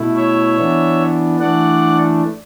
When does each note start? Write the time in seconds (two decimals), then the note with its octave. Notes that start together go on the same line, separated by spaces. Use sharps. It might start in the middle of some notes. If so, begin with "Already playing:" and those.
Already playing: B2 A3 E4
0.16 C#5 E5
0.57 E3 B3 D4
1.40 E3 A3 D4 D5 F#5